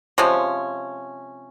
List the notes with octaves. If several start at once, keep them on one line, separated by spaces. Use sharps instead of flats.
C3 F3 G#3 C#4